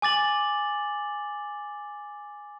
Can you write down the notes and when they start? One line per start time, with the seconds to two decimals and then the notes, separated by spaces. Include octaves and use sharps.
0.02 G#5 D6 A6 F#7